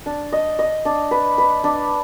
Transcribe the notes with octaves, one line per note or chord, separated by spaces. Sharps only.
D4
D#5
D#5
D4
B4
B4
D4